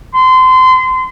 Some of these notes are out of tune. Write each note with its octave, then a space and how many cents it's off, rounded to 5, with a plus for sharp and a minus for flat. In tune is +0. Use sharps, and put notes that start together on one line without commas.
C6 -30